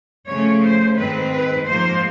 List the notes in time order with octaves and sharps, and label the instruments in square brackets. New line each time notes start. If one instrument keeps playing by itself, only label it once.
[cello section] C#3 F3 A3 C#4 C#5
C5
G#2 D#3 G#3 C4 B4
B4
G#2 F3 A#3 C5